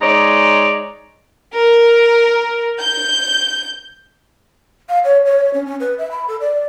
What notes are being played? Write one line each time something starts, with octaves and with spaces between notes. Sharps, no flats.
G#3 D#4 C#5 D5
A#4
G6
F5
C#5
C#5
C#4
C#4
B4
E5
B5
A4
D5